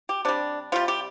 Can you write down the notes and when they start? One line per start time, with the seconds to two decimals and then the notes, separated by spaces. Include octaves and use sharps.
0.09 G4
0.25 C3 G3 D4
0.72 C3 G3 F4
0.88 G4